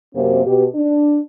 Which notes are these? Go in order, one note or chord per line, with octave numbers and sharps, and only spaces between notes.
F#2 C3 A#3 C4
B2 G4
D4